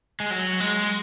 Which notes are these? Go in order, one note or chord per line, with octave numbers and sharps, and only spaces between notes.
G#3
F#3
G#3